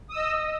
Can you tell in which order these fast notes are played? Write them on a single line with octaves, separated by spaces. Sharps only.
D#6 E6 D#5